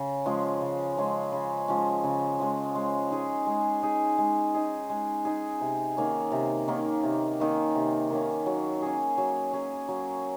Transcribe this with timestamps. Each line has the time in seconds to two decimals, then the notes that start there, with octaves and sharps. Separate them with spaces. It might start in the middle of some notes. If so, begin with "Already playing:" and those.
Already playing: C#3
0.26 F3 G#3 C#4
0.61 C#3
0.97 F3 G#3 C#4
1.32 C#3
1.68 F3 G#3 C#4
2.04 C#3
2.40 F3 G#3 C#4
2.76 G#3
3.11 D#4 G#4
3.47 G#3
3.82 D#4 G#4
4.18 G#3
4.54 D#4 G#4
4.90 G#3
5.25 D#4 G#4
5.61 C3
5.97 D#3 A#3 C#4
6.32 C3
6.68 D#3 A#3 C#4
7.03 C3
7.39 D#3 A#3 C#4
7.75 C3
8.10 D#3 A#3 C#4
8.46 F#3
8.82 C#4 G#4
9.18 F#3
9.53 C#4 G#4
9.88 F#3